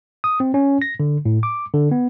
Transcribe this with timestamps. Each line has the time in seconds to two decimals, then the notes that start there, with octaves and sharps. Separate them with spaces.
0.24 D#6
0.40 C4
0.54 C#4
0.82 A#6
1.00 D3
1.26 A2
1.43 D6
1.74 D3
1.91 B3